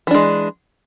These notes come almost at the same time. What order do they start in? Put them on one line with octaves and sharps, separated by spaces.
E3 D4 G#3